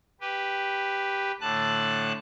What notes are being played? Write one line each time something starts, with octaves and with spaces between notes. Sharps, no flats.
G4 B4
A2 D3 A5 F#6